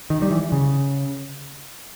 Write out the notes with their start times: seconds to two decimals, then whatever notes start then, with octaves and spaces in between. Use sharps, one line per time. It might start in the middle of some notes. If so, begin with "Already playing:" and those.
0.10 D#3
0.22 G3
0.31 E3
0.52 C#3